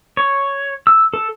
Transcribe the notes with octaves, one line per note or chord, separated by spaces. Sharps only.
C#5
E6
A4